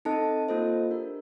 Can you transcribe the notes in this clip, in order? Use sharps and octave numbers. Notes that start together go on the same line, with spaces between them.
C4 D#4 A4 D#5 A5
A#3 F4 A4 C5 D#5
D4 G4 A#4